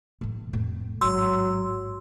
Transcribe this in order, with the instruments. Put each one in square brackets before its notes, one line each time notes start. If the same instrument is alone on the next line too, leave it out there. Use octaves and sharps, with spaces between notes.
[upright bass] A2 E3
F2 A2
[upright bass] A1 G#2 [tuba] F#3 [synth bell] C6 E6